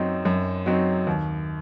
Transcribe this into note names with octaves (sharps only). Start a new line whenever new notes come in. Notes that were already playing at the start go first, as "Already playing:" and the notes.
Already playing: F#2 F#3 C4 D#4
F#2
F#3 C4 D#4
D#2